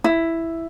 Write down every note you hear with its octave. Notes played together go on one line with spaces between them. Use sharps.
E4